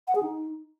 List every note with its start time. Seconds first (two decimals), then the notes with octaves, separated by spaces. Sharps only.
0.08 F#5
0.15 G#4
0.23 D#4